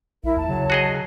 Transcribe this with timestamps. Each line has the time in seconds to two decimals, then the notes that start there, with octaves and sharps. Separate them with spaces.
0.24 A#1 E4 A#4 E5
0.37 D#2 A5
0.49 C#3 F#3
0.70 F#4 G#4 D#5